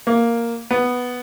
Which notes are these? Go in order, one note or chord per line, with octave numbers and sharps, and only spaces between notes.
A#3
B3